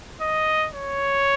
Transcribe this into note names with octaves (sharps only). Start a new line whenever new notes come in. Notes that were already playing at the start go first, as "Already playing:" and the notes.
D#5
C#5